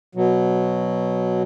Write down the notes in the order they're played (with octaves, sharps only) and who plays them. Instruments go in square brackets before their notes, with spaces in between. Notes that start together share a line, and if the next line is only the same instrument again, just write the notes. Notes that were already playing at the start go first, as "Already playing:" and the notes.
[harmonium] B2 F#3